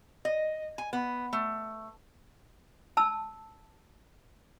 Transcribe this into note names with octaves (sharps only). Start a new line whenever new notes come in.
D#5
G#5
B3
A3
A5 E6